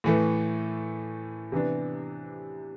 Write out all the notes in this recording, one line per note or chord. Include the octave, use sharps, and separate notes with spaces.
A2 E3 A3
C3 E3 B3 D4